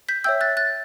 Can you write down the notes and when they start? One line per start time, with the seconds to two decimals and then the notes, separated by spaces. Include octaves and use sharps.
0.09 G6 B6
0.24 C#5 E5 G5 E6 G6
0.41 F#6 A6
0.57 F#6 A6